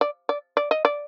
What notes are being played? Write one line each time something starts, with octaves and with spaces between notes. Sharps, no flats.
D5
D5
D5
D#5
D5